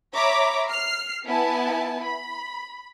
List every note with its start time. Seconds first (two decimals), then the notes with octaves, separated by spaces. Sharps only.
0.14 C#5 E5 A#5 B5 D6
0.70 F6 C7
1.26 B3 E4 G#5 A5
2.02 B5